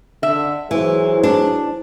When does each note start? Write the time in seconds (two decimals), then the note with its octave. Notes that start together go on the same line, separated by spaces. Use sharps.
0.23 D3 E5
0.71 E3 F#3 G#4 C5
1.23 D4